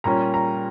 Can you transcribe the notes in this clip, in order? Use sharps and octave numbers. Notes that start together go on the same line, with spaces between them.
A#2 G3 C#4 A#5
A#5